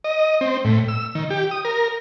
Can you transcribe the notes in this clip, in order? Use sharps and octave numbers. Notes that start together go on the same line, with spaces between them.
D#5
C4
A2
E6
D#3
G4
D#6
A#4